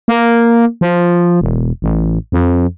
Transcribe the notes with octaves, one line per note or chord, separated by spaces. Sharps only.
A#3
F3
E1
A1
F2